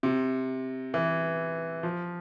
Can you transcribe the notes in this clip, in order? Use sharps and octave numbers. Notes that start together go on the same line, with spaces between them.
C3
E3
F3